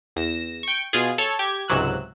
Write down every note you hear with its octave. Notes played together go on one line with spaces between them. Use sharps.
E2 A#6 E7
G5 C#6
B2 F4 G#4
A4 C#5
G4 G#6
C#2 G#2 C3 F#3 E6 F#6